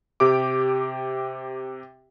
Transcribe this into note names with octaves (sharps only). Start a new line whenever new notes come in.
C3 G4 D6